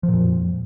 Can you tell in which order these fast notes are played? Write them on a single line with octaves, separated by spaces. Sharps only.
F3 A#2 F2